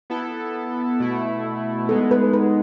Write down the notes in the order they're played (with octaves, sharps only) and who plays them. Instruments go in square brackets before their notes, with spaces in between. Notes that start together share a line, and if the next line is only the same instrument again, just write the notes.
[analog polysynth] B3 E4 A4
B2 A3 E4
[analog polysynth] G#3 B3 D#4 [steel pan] A4
[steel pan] B4
B4